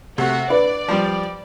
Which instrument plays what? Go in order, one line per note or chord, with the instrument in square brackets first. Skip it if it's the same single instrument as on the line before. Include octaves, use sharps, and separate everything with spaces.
[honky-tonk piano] C3 A3 [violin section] F#4
[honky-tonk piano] D4 [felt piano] B4 [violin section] D5
[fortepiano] F3 G3